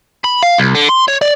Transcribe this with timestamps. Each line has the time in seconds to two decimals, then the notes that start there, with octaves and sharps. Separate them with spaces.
0.24 B5
0.43 F5
0.58 C2
0.75 D3
0.89 C6
1.08 C#5
1.22 D5